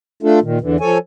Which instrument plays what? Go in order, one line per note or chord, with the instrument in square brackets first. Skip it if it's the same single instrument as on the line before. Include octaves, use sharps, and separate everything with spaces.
[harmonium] A3 D4 F4 A4
A#2 D#3
E2 D3 E3
F3 A4 C#5 G#5